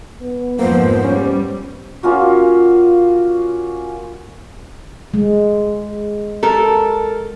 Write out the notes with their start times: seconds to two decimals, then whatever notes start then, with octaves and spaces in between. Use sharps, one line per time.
0.21 B3
0.59 F2 G#2 F3 A#3 C5
1.05 G3 C#4
2.03 A#3 C#4 F4 F#4
5.14 G#3
6.43 A4 A#4